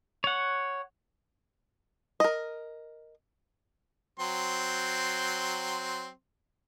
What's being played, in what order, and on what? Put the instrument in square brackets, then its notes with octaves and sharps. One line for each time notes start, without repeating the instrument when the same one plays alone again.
[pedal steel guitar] C#5 F#5
[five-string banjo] A#4 D#5
[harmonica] F#3 C4 C6